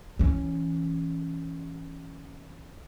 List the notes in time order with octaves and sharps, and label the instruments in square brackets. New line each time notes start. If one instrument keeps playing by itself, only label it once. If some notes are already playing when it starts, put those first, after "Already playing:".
[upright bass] E3 C#4